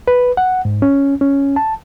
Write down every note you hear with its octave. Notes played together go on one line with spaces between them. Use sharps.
B4
F#5
G#2
C#4
C#4
A5